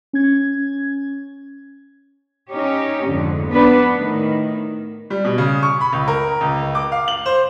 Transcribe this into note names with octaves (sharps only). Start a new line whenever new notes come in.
C#4 G#6
C#4 D#4 G4 C#5
F2 G#2 D3
B3 D4 B4
A2 D#3
G3
B2
C#3
C#6
B5
C#2
A#4
C#2
D6
F5
F#7
C5